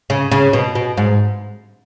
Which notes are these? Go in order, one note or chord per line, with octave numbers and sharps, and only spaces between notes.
C#3
C#3
B2
B2
G#2